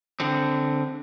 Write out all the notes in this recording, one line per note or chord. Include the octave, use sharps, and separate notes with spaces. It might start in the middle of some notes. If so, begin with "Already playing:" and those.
D3 C4